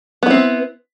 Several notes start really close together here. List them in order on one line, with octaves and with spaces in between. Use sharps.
B3 E4 C4